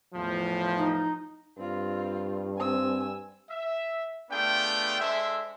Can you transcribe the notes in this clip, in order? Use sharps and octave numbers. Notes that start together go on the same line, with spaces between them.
E2 A2 F3
D#4
G2 C4 F4
C4 G#5 E6
E5
A3 B3 D4 F4 G#4 G5
G#3 D4 A4 C5 E5